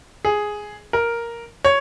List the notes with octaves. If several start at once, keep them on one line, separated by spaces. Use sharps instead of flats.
G#4
A#4
C#5